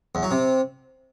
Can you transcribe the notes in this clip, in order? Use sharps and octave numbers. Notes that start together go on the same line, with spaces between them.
E2
F#3
C3